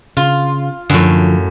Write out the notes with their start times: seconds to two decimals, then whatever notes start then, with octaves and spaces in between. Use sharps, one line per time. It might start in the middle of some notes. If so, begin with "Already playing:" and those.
0.17 C#3 F4
0.90 F#2 A2 D3 F3